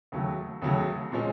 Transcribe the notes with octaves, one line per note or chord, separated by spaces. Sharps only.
D#2 C#3 F#3 A3
D#2 C#3 F#3 A3
A#2 F3 G#3 C#4